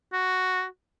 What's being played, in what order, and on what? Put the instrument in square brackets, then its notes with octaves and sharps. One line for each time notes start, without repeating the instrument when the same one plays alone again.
[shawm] F#4